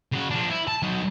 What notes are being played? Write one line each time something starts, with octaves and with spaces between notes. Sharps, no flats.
C#3 F#4
F3 D4
E4
A5
F#3 D#4